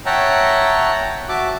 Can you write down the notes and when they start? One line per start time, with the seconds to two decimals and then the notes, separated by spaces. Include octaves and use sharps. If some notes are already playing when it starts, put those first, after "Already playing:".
0.06 C#5 E5 F#5 G5 A5 A#5
1.29 F#4 E5 A5 D6